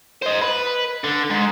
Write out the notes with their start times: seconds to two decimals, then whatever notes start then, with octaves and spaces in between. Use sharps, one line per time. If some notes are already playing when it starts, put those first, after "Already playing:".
0.22 C5 D#5
0.42 B4
1.04 D3
1.30 G#2